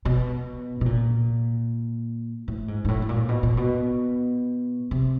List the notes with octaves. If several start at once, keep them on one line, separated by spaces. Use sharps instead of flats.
B2
B2
A#2
A2
G#2
G#2
A2
A2
A#2
B2
A#2
B2
C3